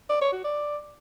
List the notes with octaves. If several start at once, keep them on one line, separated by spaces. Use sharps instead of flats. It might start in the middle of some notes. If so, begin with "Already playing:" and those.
D5
C#5
F#4
D5